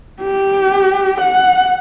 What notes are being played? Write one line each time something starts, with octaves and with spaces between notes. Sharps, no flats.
G4
F#5